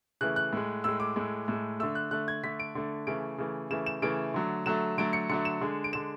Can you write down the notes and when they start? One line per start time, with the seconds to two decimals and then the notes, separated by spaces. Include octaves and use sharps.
0.21 C#3 E3 A3 F#6
0.36 F#6
0.53 A2 G#3
0.84 A2 G#3 E6
1.00 D6
1.16 A2 G#3
1.48 A2 G#3
1.80 A3 E6
1.83 D3
1.95 F#6
2.11 D3 A3 F#6
2.28 G#6
2.43 D3 A3 B6
2.60 D7
2.75 D3 A3
3.07 C#3 E3 A3 D7
3.38 C#3 E3 A3
3.70 C#3 E3 A3 E7
3.86 E7
4.02 C#3 E3 A3 D7
4.34 D3 F#3 A3
4.66 D3 F#3 A3 E7
4.98 D3 F#3 A3 D7
5.13 C#7
5.30 D3 F#3 A3 C#7
5.45 E7
5.61 D3 G#3
5.84 D7
5.93 D3 G#3 E7